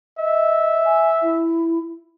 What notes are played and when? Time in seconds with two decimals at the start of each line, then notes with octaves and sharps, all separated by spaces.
0.18 D#5 E5
0.85 G#5
1.22 E4